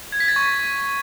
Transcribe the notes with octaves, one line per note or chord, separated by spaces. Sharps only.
G#6
B6
A6
C#6